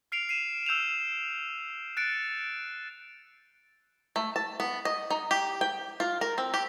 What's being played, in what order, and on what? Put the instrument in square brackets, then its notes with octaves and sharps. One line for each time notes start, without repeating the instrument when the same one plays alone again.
[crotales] F6 C7 D7 F7
C7 D#7 E7
E6 G6 E7 F7
F#6 A6 C#7 D7
[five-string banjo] A3
A5
B3
D#5
D#4
G4
G5
F4
A#4
C4
G4